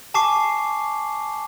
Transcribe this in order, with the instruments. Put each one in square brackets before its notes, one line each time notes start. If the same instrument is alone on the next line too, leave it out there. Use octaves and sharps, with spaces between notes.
[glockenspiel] G#5 A5 C#6 D6 C7